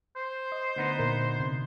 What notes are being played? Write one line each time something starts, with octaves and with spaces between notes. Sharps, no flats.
C5
D#5
D2 B3 D#4
A#2 A#4
C3